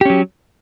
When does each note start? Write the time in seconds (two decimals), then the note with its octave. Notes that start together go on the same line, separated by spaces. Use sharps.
0.01 G4
0.05 C#4
0.10 F#3